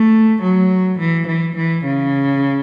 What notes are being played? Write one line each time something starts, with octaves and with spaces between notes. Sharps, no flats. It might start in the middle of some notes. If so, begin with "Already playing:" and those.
Already playing: A3
F#3
E3
E3
E3
C#3